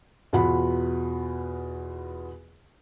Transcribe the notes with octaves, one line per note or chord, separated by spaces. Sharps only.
E2 B2 F4 F#5 B5